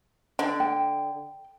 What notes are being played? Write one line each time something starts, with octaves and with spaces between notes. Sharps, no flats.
D3
G5